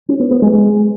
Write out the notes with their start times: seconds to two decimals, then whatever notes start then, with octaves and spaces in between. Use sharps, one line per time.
0.09 C#4
0.20 B3
0.31 B3
0.42 G#3
0.53 G#3